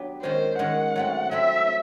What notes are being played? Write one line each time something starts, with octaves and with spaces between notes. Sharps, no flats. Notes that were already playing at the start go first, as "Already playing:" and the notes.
Already playing: F#3 B3 D4 G4 B4
D#3 G#3 C#4 C5
D#3 G#3 C#4 F#5
F#3 A3 C4
F#3 A3 C4 E5